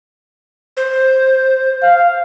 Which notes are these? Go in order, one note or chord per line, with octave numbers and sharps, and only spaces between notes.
C5
F5